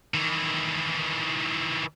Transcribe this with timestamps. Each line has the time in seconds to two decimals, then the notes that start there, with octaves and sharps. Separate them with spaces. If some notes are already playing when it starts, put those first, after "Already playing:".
0.14 D#3 E3